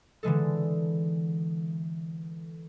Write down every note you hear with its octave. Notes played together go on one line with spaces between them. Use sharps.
D3 E3 G#3 A4